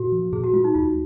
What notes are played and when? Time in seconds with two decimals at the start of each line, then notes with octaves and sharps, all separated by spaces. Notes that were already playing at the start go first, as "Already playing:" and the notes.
Already playing: A#2 F#4
0.12 F3
0.33 A#2 G#4
0.44 F#4
0.53 G#3 F4
0.64 D#4
0.75 D#2 F4